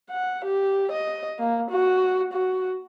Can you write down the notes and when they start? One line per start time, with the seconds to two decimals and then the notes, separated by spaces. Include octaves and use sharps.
0.10 F#5
0.45 G4
0.92 D#5
1.39 A#3
1.71 F#4
2.33 F#4